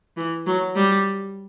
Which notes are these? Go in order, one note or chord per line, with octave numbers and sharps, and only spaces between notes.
E3
F#3
G3